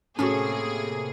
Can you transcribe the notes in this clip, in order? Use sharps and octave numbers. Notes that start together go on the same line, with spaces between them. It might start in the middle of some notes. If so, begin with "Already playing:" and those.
A2 C3 A3 A#3 C#4 F#4 G#4